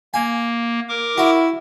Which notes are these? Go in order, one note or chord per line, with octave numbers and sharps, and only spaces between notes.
A#3 G#5
A#4 D6
E4 F#4